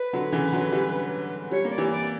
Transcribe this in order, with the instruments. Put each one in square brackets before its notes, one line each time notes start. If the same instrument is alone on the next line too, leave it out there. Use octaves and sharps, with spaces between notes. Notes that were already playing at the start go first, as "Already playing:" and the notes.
Already playing: [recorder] B4
[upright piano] D3 F#3
C#3 E3
D3 F#3
E3 G3
[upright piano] G3 [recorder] C#5
[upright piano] A#3
[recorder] D5
[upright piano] E3 G3
[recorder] D5